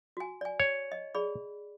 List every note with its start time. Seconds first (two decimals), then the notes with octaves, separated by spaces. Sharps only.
0.17 F#4 G#5
0.41 D5 G#5
0.60 C#5
0.92 D#5
1.15 G#4 D5 B5